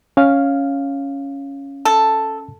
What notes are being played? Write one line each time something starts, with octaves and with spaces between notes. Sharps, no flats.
C#4 F5
A4